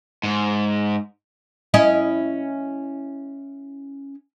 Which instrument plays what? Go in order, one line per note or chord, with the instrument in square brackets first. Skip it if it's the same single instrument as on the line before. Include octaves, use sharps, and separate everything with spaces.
[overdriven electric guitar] G#2
[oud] C#4 E4 D#5